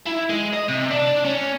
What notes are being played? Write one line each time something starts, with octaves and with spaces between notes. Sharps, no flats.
E4
G#3
D#5
C3
D4
C#4